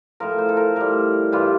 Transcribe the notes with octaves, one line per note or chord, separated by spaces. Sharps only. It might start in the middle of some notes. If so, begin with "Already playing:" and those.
A2 F3 A#4
C5
A4
A#4
A2 G3 A#4
G2 E3 G3 F4